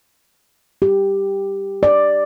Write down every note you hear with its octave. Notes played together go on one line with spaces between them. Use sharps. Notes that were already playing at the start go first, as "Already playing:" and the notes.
G4
D5